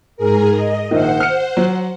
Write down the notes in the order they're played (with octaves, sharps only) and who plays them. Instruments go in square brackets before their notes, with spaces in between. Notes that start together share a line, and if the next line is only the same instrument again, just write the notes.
[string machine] G#2 G#4 A#4
D#5
[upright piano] A#1 D#3 [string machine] C5 F#5
[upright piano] F6 C#7
F#3